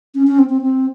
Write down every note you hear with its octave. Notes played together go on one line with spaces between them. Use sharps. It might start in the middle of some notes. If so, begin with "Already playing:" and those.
C#4
C#4
C4
C4
C4